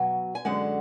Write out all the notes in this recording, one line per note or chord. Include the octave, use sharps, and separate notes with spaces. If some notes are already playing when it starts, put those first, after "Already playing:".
Already playing: B2 F#3 G#5
G#5
F#2 D3 G#3 F#5